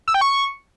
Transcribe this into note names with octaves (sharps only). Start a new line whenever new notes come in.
E6
G5
C#6